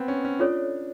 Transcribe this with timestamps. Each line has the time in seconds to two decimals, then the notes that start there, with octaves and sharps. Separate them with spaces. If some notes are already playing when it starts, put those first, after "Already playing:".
Already playing: B3 C4
0.08 C#4
0.25 C#4
0.39 D4 F4 A4 C#5